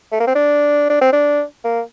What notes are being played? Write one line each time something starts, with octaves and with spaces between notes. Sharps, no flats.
A3
A#3
C4
D4
D4
C4
D4
A#3